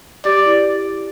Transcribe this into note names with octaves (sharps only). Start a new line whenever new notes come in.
G4 D5
E4